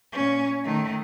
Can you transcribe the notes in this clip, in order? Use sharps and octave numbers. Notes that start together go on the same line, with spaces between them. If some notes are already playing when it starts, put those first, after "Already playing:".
A#2 C#4
D#3 A3